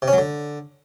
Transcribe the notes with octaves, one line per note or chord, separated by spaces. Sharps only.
C3
C#4
F#3
D3